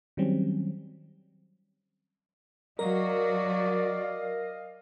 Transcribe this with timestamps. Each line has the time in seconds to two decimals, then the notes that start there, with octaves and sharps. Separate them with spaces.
0.17 D#3 F#3 G3 C4 C#4
2.79 F#3 F#4 A#4 D5 D#5 F5